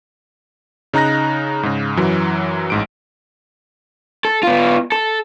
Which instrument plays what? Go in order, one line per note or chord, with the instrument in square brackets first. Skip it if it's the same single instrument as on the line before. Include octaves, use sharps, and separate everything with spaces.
[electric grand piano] C#3 D#4 A#5 F#6 A#6
G#2 C#3
F#2 E3 F#3
A1 G#2 D7
[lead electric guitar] A4
B3 F4
A4